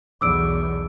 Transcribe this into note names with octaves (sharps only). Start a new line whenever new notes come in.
B1 E2 D6 E6 D7